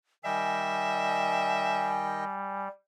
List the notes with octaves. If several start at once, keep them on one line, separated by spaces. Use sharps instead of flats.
D#3 G3 D#5 E5 G5 G#5